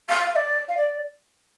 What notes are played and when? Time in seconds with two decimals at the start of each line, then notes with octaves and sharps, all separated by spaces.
0.09 F5
0.32 F5
0.35 D5
0.69 F5
0.77 D5